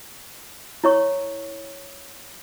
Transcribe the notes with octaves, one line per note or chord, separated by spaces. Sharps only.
E4 C#5 C#6